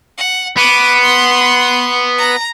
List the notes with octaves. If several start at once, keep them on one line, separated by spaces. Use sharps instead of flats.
F#5
B3 D6 D#7
C6
A#5